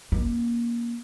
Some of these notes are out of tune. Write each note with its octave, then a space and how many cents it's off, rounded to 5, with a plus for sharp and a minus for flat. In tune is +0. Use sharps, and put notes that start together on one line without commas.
A#3 +20 C#4 -5